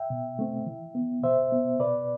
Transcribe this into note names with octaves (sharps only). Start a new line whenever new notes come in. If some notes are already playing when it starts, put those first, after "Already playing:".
Already playing: E5 G5
B2
A3 C4
E3
B3
B2 C5 E5
B3
B2 B4 D5